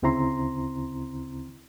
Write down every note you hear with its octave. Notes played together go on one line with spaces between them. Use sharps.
D2 C#3 C4 E4 A#5 C6